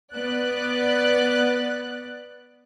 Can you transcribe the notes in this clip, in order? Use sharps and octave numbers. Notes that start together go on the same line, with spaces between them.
B3 D5 F#6